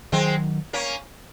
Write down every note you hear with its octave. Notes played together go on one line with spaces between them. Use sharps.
D#3 F#3 G#3 C4
A#3 C#4